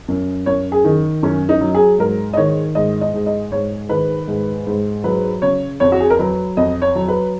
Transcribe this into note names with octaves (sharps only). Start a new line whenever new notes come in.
F#2
F#2 C#5
G#4
D#3
F#2 C#4
D#4
F#3
G#4
G#2 A#4
D#5
D#3 C#5
G#2 D#5
D#5
G#2
D#5
G#2 C#5
D#3 B4
G#2
G#2
F#3 B4
C#3 C#5
F2 C#5
F#4
G#4
A#4
F#3 B4
F2 D#5
C#5
F#3
B4